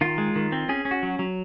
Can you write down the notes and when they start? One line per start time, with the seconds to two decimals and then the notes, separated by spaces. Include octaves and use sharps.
0.01 D#3 F4
0.18 G#3
0.36 D#3
0.52 C4
0.69 C#4 G#4
0.85 C#4
0.91 F#4
1.03 F#3
1.19 F#3